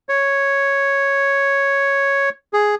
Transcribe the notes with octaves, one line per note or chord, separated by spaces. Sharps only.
C#5
G#4